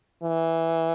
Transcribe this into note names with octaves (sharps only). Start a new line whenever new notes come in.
E3